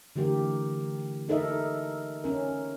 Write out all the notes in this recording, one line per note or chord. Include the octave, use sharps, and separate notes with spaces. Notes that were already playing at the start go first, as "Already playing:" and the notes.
D3 E3 A3 G4 A#4
D#4 A4 A#4 D#5 E5
C#4 A#4